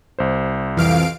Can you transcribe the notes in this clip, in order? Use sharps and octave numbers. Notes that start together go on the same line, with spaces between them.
C2 C5
F2 E3 F5 D7